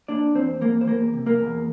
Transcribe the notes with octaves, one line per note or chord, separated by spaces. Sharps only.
A#3 D4 D5
E2 C4 C5
E2 A#3 A#4
C5
E2 A#3 A#4
C3
A#3 A#4
E2